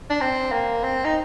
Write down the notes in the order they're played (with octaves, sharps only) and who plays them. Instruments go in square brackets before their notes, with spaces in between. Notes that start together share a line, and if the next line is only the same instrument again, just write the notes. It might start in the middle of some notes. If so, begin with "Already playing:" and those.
[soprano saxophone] D4
C4
A#3
C4
D#4